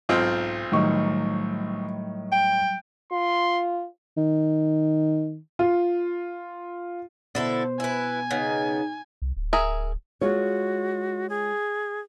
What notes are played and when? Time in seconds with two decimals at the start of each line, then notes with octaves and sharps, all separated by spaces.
0.09 B1 G#2 C4 F4
0.72 A2 D#3 F#3 G3 C#6
2.32 G5
3.12 F4 C6
4.17 D#3
5.59 F4
7.35 B2 D3 E4 A4 C5
7.80 E4 B4 G#5
8.31 C#3 B3 D#4
9.22 C2
9.37 D1
9.53 G#4 A#4 E5
10.21 G#3 F4 F#4 C#5
11.30 G#4